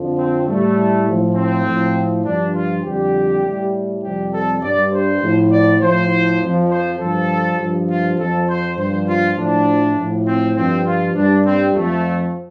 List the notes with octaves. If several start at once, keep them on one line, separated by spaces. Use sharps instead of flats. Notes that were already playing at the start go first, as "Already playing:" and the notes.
Already playing: F2 D3 F3
C4
A2 G3 A3
A2 F3
C4
A2 F3
G2 F3 D4
F4
F2 D3 G3 G4
A2 G3
F2 C3 G3 G4
A4
G2 G3 D5
C5
A2 F3
D5
A2 F3 C5
F2 F3
C5
G2 F3 A4
G2 F3
F4
F2 F3 A4
C5
G2 F3 C5
F4
A2 F3 D4
A2 F3
C4
G2 F3 C4
F4
G2 G3 D4
C4
F2 F3 A3